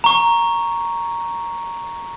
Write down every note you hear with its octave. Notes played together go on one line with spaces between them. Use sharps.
A#5 C#6